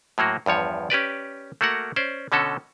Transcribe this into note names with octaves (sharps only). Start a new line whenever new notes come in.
A2 F#3 A#3 F#4
E2 G2 F3 C#5
C#4 G4 B4 D5
A3 A#3 F#4 A#4 F#5
C#4 C5 D5
B2 D3 C#4 F#4 A4